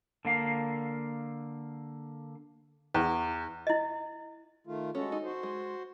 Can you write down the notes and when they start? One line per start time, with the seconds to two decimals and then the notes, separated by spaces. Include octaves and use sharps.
0.25 D3 A#3 F5
2.94 E2
3.67 E4 D#5
4.67 D#3 A3 F4
4.95 G#3 C#4 F#4 A4
5.12 D#4
5.24 F#4 C5
5.43 G#3